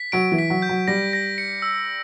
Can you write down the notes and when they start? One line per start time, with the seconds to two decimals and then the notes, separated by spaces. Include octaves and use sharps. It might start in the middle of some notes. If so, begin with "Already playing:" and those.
Already playing: B6
0.12 F#3 D7
0.32 E3
0.38 B6
0.50 F#3
0.62 G6
0.69 F#3
0.88 G3 A#6
1.13 A#6
1.38 C#7
1.62 E6